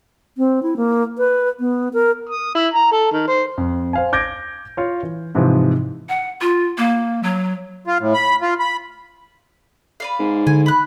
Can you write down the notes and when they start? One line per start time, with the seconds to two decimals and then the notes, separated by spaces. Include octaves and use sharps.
0.38 C4
0.63 E4
0.77 A#3
1.18 B4
1.60 B3
1.93 A#4
2.29 D#6
2.55 E4
2.74 A#5
2.92 A4
3.12 D#3
3.28 C5
3.58 F2
3.93 C5 F5 G#5
4.13 D6 G6 G#6 A#6 D7
4.77 F4 C#5
5.03 E3
5.35 G#2 C3 E3 F3
6.09 F#5
6.41 F4
6.78 A#3
7.23 F#3
7.87 F4
8.01 A2
8.14 B5
8.42 F4
8.59 B5
10.00 B4 D5 F5
10.19 G#2
10.47 D3 G#5
10.66 B5 F#6